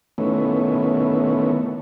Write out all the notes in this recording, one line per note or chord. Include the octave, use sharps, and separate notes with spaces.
D#3 A3 B3 C#4 E4